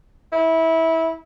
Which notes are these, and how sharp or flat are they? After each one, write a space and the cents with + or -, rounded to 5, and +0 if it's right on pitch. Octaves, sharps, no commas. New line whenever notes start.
E4 -20